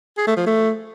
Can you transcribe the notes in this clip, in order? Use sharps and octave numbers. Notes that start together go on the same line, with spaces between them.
G#4
A3
F3
A3